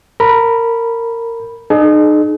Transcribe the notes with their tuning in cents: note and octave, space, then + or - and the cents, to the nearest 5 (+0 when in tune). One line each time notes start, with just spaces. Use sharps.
A#4 -20 B5 -10
D#4 -35 G#4 +40